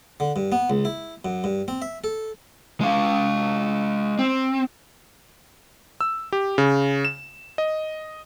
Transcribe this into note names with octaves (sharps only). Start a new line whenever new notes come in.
D3
G2
B3
C#2
E4
F#2
G2
C4
E5
A4
G#3 F5
C4
E6
G4
C#3
E7
D#5